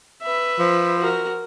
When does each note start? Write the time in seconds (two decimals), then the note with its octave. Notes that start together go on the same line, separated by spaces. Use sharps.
0.22 B4 E5
0.59 F3
0.99 F#4 A#4